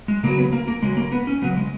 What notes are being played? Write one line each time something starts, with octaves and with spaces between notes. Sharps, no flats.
G#3
C#3 F#3 A#3
B3
A#3
A#3
C#3 F#3 G#3
A#3
B3
C#4
C#3 F#3 B3
G#3